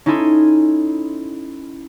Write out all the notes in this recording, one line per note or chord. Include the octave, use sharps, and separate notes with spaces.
C#4 D#4 E4 A4 G#5 C6